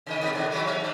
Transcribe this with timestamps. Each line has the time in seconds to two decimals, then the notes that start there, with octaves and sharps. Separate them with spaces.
0.06 C3 D#3 D#5
0.23 G#2 B2 D#3
0.35 B2 D3 E3
0.51 D#3 F#3 G#3
0.64 C3 F#3 C#4
0.80 G#2 D4